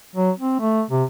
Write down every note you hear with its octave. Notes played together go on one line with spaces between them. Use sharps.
F#3
C4
A3
C3